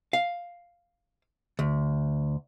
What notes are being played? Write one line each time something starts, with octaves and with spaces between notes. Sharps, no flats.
F5
D2